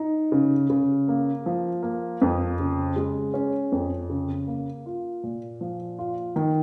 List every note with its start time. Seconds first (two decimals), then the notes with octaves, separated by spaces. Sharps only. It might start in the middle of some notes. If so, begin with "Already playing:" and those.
Already playing: D#4
0.32 C#3
0.70 C#3
1.08 A#3
1.46 F3
1.83 A#3
2.22 F2
2.59 C#3
2.96 G#3
3.34 C#4
3.72 F2
4.10 C#3
4.47 A#3
4.86 F4
5.24 A#2
5.61 F3
5.99 F4
6.36 D#3